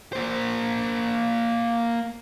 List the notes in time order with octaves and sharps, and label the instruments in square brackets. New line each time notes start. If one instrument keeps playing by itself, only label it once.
[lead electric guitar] A#3 C5